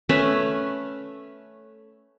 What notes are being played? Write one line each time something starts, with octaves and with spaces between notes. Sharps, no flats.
A3 C#4 B4